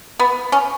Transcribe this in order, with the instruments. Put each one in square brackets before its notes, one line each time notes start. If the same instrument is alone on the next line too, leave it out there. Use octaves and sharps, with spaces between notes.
[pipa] B3
C#4